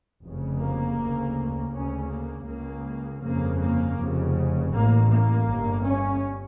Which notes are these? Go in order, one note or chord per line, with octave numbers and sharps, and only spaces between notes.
F1 F2 C#3
A#3
D2 C#3
D2 C#3 C#4
A#3
C#2 C#3 A#3
G1 F2 C#3 A#3
A#3
F1 F2 C#3
A1 A2 A#3
A#3
G1 G2
C#4